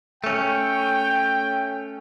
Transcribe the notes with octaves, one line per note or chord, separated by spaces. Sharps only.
A3 C#4 G5